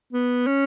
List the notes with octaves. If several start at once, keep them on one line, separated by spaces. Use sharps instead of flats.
B3
C#4